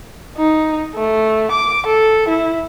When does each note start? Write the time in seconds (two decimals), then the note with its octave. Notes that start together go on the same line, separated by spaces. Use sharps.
0.37 D#4
0.95 A3
1.51 D6
1.86 A4
2.28 E4